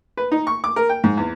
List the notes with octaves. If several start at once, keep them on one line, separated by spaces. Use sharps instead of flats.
B4
D#4
C#6
D6
A#4
G5
G#2
E2